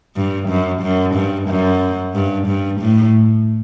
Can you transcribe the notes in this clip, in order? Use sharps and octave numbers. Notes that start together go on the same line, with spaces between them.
G2
F#2
F#2
G2
F#2
G2
G2
A2